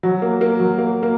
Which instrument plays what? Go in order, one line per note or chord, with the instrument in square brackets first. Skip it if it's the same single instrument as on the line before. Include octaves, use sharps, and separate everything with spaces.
[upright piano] F#3
A#3
A#3
F#3
A#3
A#3